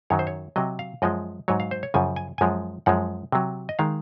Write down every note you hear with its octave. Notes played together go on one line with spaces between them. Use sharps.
F#2 D#3 F#3 C#5
C5
C#5
C3 F#3 D#5
F5
F#2 F3 G#3 D#5
G#2 F#3 C#5
F5
C5
C#5
F#2 C#3 F3 G#5
G#5
F#2 F3 G#3 G#5
F#2 F3 G#3 F#5
C3 F#3
D#5
D#3 G#3 F5